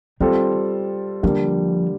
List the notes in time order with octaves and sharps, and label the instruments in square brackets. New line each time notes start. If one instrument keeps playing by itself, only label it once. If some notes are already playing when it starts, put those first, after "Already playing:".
[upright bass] D#3 [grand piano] G3 C4 F4 A4
[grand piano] D3 G3 A#3 [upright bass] F3